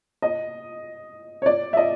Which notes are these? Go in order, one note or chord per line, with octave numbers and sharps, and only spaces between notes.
D#5
C#5
D5
E5
D#5